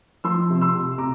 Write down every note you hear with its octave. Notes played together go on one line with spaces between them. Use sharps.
F3 C6 E6
C3
C6 E6
C3
C3 A#5 D6